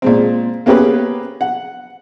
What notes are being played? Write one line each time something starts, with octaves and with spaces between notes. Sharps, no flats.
A#2 G#3 C4
A#3 B3 C#4 G4 G#4 B4
F#5